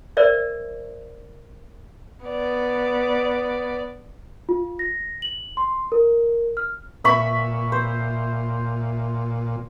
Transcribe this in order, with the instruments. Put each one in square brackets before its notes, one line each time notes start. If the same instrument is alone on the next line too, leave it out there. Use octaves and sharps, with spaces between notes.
[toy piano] A#4 C5 D5 E5
[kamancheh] B3 D5
[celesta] F4
A#6
F#7
C6
A#4
F6
[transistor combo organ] A#2 [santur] E5 B5 C#6
[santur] C5